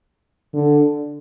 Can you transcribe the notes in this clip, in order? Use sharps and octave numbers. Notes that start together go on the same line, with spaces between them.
D3